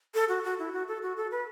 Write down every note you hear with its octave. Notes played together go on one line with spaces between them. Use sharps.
A4
F#4
F#4
E4
F#4
A4
F#4
A4
B4